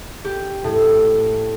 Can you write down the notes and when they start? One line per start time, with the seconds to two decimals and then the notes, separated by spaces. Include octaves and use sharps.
0.25 G4
0.64 A2